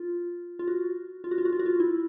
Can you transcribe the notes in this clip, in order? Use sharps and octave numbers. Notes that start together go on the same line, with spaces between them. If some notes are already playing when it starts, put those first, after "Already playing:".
Already playing: F4
F4
F#4
F4
F#4
F4
F#4
F4
F#4
F4
E4